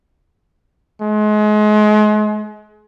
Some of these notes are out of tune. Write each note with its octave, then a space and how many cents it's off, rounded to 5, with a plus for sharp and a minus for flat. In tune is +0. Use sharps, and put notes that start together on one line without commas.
G#3 +35